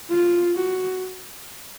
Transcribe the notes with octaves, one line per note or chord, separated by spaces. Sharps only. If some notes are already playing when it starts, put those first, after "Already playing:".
F4
F#4